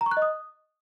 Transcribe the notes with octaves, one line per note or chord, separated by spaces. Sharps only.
A#5
C#6
F#6
D#5
D#6